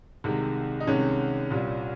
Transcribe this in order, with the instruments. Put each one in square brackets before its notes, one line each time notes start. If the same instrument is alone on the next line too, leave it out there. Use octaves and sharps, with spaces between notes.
[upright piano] C2 C3 D#3 G#3
D#4
C2 C3 D#3 G#3 C#4
C2 A#2 G3